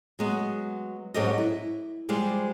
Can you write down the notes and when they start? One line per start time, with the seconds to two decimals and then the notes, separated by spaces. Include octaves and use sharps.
0.19 F#3 G#3 B3
1.14 G#2 F#3 C#4 G4 A4 D#5
1.38 E4
2.09 F3 G3 G#3 F4 G4 C5